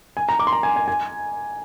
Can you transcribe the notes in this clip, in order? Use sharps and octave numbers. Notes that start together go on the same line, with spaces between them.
G#5
A#5
D6
C6
A#5
G#5
G#5
G#5